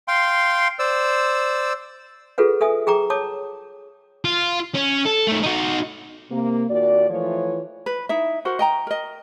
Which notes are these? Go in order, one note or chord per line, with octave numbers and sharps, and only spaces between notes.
F5 G5 C6
C5 D5 E6
F4 G#4 A4 B4 F#5
A4 E5 G#5 D#6
G#4 G5 A#5 D6
C#5 A5 D6 D#6
F4
C#4
A4
D#3 A3
D#4 F#4
C3 A#3
D#2 A#2 F#4 D5
E3 F3 A3 F4 C#5
B4
D#4 E4 E5
F#4 A#4 C5 F#5
D#5 G5 A#5
A#4 D#5